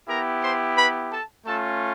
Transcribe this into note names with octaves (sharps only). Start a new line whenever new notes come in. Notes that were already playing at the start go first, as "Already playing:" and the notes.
B3 E4 G4 A#4 A#5
C5 C6
B4 B5
A4 A5
A3 C#4 F4 A4 A5